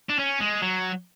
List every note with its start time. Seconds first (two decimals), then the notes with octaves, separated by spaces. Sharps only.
0.09 D4
0.19 C#4
0.40 G#3
0.62 F#3